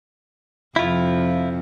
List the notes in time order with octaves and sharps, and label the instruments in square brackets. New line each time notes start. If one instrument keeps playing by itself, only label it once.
[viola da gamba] F2 C3 [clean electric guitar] E4 F4